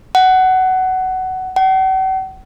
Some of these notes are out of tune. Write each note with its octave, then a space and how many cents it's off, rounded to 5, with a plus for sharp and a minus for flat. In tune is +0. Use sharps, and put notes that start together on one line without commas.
F#5 +15
F#5 +45